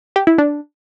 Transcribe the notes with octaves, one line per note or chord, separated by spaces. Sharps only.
G4
E4
D4